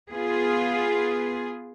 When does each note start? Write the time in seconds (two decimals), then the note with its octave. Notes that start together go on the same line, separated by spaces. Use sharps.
0.11 B3 F4 G#4